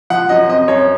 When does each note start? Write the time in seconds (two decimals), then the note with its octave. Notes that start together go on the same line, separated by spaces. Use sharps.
0.10 F3 F#5
0.29 F#2 D#5
0.49 C4 D#5
0.68 F#2 C#5